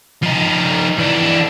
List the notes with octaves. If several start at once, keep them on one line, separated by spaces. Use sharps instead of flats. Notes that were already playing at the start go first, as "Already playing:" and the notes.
F3 D#4
E3 D4